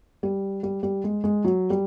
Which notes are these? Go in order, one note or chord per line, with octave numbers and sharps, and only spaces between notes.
G3
G3
G3
G#3
G#3
F#3
G3